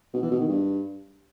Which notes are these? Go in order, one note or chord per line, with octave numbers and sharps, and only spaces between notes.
B2
E3
B2
D#3
G2